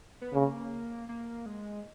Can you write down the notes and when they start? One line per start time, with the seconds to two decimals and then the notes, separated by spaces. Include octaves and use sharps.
0.21 B3
0.34 C#3 A#3
1.09 A#3
1.46 G#3